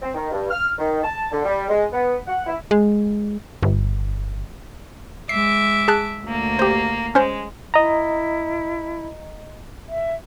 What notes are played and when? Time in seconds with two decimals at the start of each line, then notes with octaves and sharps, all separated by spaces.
0.02 C4
0.14 D#3
0.31 G2
0.50 F6
0.78 D#3
1.03 A5
1.31 D3
1.44 G3
1.69 G#3
1.92 B3
2.26 F#5
2.46 E4
2.71 G#3
3.63 G1
5.29 G#3 E5 D6 C7
5.88 G#4 A5 F#6
6.23 D2 A#3
6.59 G4 C5
7.15 G#3 C#4 C5
7.74 E4 D#5 A#5
9.89 E5